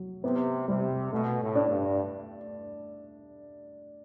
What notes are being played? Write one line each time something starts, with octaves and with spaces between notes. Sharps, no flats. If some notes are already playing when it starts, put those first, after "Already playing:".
Already playing: F#3
C3 B3
C3 G3
B2 A3
A2
D4
G2